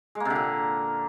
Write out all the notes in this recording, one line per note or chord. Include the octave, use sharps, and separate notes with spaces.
G#3
A#3
C3
D3
A#2